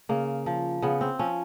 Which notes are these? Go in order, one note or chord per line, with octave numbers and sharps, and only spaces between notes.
C#3 A#3
F3
C#3 B3
C4
F3 C#4